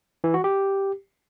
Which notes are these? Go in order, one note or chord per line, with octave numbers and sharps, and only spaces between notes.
E3
F#4
G4